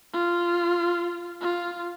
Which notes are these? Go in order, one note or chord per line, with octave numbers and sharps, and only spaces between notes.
F4
F4